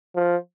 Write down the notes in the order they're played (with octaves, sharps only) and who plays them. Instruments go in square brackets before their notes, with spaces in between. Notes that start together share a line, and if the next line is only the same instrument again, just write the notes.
[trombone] F3